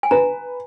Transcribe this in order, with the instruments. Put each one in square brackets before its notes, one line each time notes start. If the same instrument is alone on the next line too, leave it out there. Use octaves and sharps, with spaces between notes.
[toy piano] G#5
[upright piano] B4 [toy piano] A#5